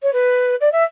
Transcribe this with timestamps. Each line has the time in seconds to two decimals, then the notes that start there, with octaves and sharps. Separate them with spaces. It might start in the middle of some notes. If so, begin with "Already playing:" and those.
0.02 C#5
0.12 B4
0.60 D5
0.72 E5